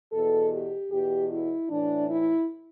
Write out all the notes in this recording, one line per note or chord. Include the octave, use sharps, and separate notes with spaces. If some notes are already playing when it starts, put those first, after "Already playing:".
E2 B2 A4
G4
E2 B2 G4
E4
A2 E3 D4
E4